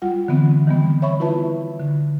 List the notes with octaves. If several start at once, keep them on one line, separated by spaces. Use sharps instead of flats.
G3 F4 F#5
D3 E3 B3 C4
D#3 E3 G3 B3
C#5 E5 B5 C#6
E4 F4 B4 E5 A5
D3